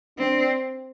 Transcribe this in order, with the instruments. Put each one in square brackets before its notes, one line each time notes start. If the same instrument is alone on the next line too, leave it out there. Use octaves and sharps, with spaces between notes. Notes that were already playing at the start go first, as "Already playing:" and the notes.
[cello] C4 [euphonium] D4